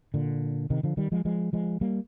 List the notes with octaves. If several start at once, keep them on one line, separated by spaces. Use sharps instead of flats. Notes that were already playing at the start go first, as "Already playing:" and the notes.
A#2 D3
C3 D#3
D3 F3
D#3 G3
F3 G#3
F3 G#3
F3 G#3
G3 A#3